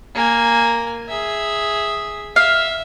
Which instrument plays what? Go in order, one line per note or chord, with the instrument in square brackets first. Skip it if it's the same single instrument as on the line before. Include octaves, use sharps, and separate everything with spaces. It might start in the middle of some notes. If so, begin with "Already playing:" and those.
[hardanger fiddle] A#3 G#5
G#4 E5
[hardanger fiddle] E5 [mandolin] F5